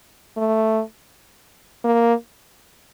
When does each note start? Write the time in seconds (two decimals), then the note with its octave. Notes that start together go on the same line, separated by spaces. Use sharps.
0.37 A3
1.84 A#3